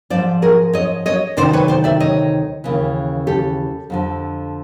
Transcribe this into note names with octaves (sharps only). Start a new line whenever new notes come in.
G#2 F3 C5 D5
G#4 A#4
C#5 D#5
C#5 D#5
D2 C3 D#3 C5 D5
B4 C#5
C5 D5
D5 E5
C#5 D#5
D#2 C#3 E3
G4 A4
F2 D3 F3